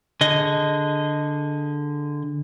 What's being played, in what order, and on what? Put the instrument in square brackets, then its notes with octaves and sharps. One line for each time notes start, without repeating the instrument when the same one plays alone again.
[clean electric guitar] D3 G#4 D#5